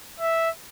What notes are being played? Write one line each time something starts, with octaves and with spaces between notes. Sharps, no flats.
E5